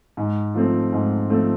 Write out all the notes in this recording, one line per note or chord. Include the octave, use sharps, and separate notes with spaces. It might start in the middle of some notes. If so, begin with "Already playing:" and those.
G#2
F3 A3 C4
G#2
F3 A3 C4